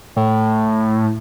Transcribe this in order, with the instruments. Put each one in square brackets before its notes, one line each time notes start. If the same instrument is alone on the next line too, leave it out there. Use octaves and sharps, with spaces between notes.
[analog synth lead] A2